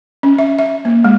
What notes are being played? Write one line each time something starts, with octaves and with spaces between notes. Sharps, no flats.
C#4
E5
E5
A#3
G#3